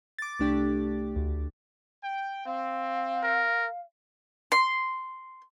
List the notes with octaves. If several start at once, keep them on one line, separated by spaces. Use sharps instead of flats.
D6 A6
C2 A3 D4 G4
D2
G5
C4 F5
A#4
C6